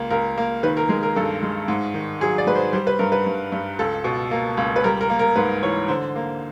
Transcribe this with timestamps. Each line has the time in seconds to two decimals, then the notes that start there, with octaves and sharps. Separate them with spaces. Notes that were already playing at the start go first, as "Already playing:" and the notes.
Already playing: C#2 A#3
0.10 C#2 A#4
0.38 A#3
0.63 D#3 B4
0.77 A#4
0.89 G#3 A#4
1.03 A#4
1.16 G2 A4
1.43 G#3
1.68 G#2
1.94 D#3
2.21 F#3 G#4
2.38 D5
2.47 G#2 B4
2.55 C5
2.73 G3 C5
2.87 B4
2.99 G2 A#4
3.12 B4
3.27 G2
3.52 G2
3.79 C#2 A4
4.04 B2
4.31 A#3
4.57 C#2
4.76 B4
4.84 G3 A#4
5.01 A#4
5.10 A#3
5.19 A#4
5.36 G#2 B4
5.63 E3 C#5
5.88 D3 C5
6.16 A#3